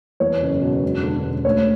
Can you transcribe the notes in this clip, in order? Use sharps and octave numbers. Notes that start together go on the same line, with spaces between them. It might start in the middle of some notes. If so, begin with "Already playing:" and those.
E2 C#5
F#1
B2
E1
D3
E1
D2 C#5